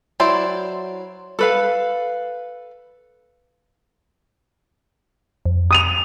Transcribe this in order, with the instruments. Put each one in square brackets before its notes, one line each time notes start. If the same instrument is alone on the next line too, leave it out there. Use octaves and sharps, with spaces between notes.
[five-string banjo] F#3 E4 C5 D5
[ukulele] A4 B4 F5
[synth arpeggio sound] F2
[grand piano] D#6 D#7 F7